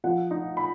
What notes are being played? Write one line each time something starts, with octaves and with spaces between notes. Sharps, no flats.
F3 F#5
D#4
B5